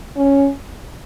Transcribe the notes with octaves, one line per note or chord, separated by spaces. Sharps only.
C#4